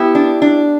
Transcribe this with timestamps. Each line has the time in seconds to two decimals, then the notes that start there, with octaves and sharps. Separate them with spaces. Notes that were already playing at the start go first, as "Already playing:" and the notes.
Already playing: B3 E4 G4
0.15 D4
0.42 D4